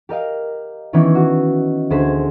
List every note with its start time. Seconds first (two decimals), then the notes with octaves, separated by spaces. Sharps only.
0.09 G4 A#4 D#5 F5
0.93 D#3 E3 B3 C#4 D#4 E4
1.15 F#4
1.90 D2 G#4 C5 G#5 B6